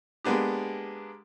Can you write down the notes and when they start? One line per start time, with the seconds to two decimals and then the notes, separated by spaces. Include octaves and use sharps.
0.24 G#3 A#3 B3 D4 G4